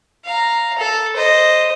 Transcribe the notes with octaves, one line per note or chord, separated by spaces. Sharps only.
F5 A#5
A4
C5 D#5